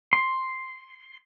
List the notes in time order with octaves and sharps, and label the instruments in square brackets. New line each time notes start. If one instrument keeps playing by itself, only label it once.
[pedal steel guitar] C6